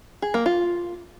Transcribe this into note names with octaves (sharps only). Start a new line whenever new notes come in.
G#4
A#3
F4